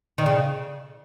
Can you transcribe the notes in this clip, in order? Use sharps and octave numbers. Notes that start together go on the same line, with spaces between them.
D#3
C#3